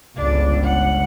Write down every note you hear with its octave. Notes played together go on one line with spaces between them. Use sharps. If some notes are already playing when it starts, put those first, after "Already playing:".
G1 C#2 D4
F#5